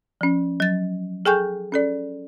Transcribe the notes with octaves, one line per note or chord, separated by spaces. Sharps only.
F3 C#4
F#3 A6
G#4 A4 G5 G#5 C#6 G6
C#4 A4 D5